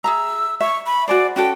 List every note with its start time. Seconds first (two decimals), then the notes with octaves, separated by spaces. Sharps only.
0.04 G#4 E5 A#5 E6
0.61 E5 C#6
0.86 B5
1.08 F#4 G#4 C5 D5
1.36 C#4 F#4 A4 G5